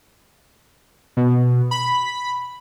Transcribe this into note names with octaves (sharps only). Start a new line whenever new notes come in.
B2
B5